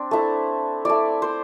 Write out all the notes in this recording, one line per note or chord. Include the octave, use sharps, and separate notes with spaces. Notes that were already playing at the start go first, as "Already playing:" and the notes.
Already playing: C4 D4
A3 E4
A3 E4 D5
C5